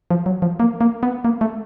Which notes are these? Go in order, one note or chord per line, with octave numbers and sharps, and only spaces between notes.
F3
F#3
F3
A#3
A#3
B3
A#3
A3